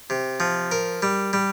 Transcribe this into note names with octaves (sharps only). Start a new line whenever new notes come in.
C3
F3
A#4
G3
G3